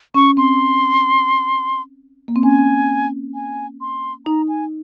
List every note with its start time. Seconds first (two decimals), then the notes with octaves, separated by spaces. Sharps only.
0.14 C#4 C#6
0.37 C4 C6
2.28 A#3
2.36 C4
2.43 C#4 G#5
3.34 G#5
3.81 C6
4.26 D#4 A#5
4.49 G#5